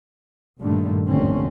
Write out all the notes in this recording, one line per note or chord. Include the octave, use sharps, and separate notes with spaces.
A#1 G2 A#2 D3 D#3 A3
F1 D#2 G#2 D3 C4 C#4